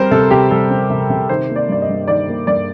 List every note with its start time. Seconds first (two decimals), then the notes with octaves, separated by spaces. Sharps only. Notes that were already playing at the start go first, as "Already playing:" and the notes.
Already playing: G3 C4 A#4 C5
0.11 C3 A4
0.31 C3 G4
0.51 G3 A4
0.70 C4
0.90 C3
1.09 C3
1.29 D#3 C5
1.49 A#3
1.56 D5
1.69 G2 D5
1.82 D#5
1.89 G2
2.08 D#3 D5
2.28 A#3
2.47 G2 D5